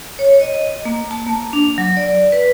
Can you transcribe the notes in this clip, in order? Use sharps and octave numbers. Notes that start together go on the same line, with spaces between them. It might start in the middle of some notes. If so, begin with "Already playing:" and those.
C#5
D#5
A#3
A5
A#3
D4
F#3
D5
B4